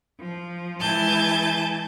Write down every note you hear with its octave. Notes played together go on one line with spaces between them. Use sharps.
F3
E3 G#3 G#5 A5 G6 A6